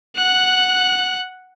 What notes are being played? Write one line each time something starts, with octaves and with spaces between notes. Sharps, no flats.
F#5 F#6